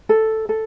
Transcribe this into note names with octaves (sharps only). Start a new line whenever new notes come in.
A4
A4